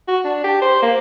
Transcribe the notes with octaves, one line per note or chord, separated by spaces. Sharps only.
F#4
D4
G4
C5
A#3